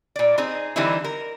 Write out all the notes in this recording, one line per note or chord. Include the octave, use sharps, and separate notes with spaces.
A#2 D5
C4 D#4 G#4
D3 E3 G3 C4 D#4 E4
A#4